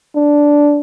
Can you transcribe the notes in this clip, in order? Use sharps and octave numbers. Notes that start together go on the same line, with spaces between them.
D4